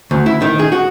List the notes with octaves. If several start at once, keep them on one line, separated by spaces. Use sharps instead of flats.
D2
E4
D#3
G#4
F#4